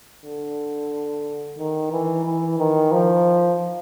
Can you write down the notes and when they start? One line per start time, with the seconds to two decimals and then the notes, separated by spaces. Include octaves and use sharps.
0.25 D3
1.58 D#3
1.92 E3
2.25 E3
2.59 D#3
2.92 F3